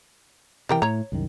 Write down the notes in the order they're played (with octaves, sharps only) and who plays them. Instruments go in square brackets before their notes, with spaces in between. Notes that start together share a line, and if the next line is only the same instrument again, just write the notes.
[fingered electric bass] C3 E3 [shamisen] G3 A#4 G5
[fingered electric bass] A2 [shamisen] C#5 A#5
[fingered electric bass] C2 F#2 D#3